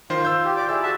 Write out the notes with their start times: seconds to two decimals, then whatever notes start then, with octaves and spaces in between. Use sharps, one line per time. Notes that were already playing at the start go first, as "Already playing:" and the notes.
0.10 D#3 F4 C5
0.25 E6 G6
0.45 G4
0.57 G4 D5 D6
0.69 E4 G#4 D5 E6
0.83 F#4 E5 A5